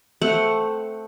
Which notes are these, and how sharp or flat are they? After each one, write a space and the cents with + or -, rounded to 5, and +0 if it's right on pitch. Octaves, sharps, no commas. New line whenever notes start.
A3 +0 C4 +0 F#5 +0